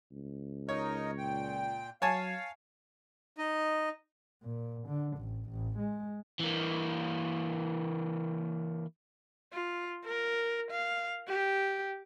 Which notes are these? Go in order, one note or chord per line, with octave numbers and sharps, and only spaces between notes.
C#2
D#4 A#4 C#5 D#5
A#2 G5
F#3 C#5 F5 G#5 A5
D#4 D#5
A#2
D3
A1
A1
G#3
E3 A#3
F4
A#4
F5
G4